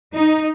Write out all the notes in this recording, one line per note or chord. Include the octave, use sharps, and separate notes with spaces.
D#4